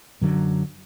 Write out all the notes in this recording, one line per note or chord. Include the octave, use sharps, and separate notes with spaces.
F#2 D3 F#3